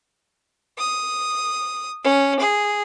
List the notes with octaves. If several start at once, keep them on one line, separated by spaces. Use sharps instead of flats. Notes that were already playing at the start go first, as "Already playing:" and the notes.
D#6
C#4
G#4